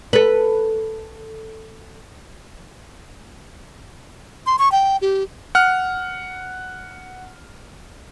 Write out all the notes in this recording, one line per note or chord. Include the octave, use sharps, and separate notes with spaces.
A4 B4
C6
C#6
G5
G4
F#5 F6